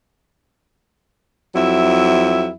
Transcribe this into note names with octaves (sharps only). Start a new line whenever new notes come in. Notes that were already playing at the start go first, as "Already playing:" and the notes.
F2 F#3 E4 E5